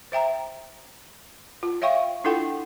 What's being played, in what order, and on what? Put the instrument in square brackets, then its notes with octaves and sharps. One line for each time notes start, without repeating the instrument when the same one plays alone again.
[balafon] C5 E5 G5 A#5
F4
C#5 E5 F5 G5 C#6
D4 E4 F4 A4 F#5 G5